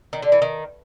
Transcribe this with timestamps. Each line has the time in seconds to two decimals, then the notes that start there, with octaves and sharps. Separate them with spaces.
0.13 D#3
0.22 D3
0.32 E3
0.42 D#3